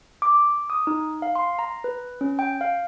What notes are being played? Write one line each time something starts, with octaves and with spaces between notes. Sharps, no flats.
D6
D#6
D#4
F5
C6
A#5
B4
C#4
G5
F5